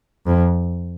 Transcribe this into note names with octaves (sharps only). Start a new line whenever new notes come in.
F2